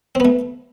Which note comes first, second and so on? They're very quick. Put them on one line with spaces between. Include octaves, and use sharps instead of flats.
C4 B3 A3